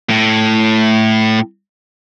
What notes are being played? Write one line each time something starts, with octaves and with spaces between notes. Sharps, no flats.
A2